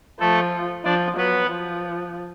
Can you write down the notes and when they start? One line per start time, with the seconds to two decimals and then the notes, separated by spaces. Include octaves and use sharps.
0.20 F3 A3 A4
0.85 F3 D4 D5
1.17 F#3 B3 B4
1.49 F3